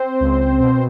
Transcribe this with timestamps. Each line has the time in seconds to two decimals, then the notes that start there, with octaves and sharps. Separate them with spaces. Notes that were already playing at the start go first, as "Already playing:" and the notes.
Already playing: C4 C5
0.20 C#2
0.59 B2